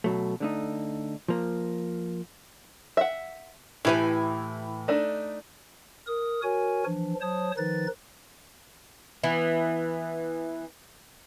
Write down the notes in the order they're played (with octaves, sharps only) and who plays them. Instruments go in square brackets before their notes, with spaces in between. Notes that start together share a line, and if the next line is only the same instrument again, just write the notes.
[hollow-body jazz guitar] B2 F#3 A3
D3 A3 D#4
F3 A#3
[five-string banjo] E5 F#5
[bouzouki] A2 E3 G#5 [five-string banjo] E4 G4 B4
[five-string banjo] A3 D4 D#4
[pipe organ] A#4 D#6
F#4 A#4 C#5 G#5
E3 F3 D4
F#3 C5 C#5 A5 D#6
D#3 F3 D#4 B4 A6
[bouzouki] E3 B3